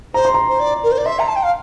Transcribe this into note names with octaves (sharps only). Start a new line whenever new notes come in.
C5 A#5
C6
A#5
C5
D5
A#4
C5
D5
E5 C6
A#5
A5
G5
F5